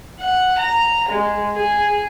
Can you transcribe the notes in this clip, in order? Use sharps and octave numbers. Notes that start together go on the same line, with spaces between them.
F#5
A#5
G#3
G#4